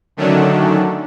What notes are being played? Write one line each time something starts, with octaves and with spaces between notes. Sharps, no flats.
D3 D#3 F#3 A3 C#4 D4